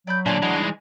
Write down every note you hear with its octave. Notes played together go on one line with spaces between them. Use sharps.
F#3 D5 B5 G6
A#2 D3 D4 C#5 D5 G#5
E3 G#3 F#4 D#5 A#5
G3 D#4 G#5